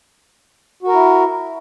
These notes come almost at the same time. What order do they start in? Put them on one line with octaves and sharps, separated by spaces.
F#4 A#4 E4